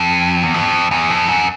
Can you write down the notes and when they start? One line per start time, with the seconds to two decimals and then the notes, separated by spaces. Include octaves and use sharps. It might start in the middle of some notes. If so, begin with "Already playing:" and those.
Already playing: F2
0.43 E2
0.54 F2
0.91 E2
1.10 F2
1.28 F#2